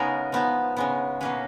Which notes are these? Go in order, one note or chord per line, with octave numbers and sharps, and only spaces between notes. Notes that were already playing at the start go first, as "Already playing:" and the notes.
Already playing: C#3 G#3 B3 D#4 G#4 A#4
F3 B3 D#4
C#3 G#3 B3
B2 A#3 C#4 B4